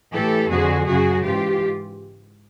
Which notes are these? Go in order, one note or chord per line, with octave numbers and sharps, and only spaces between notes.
A2 E3 G4 A4
F2 D3 F3 F#4 G#4
F#2 C#3 F#3 F#4 G#4
G#2 E3 F4 G4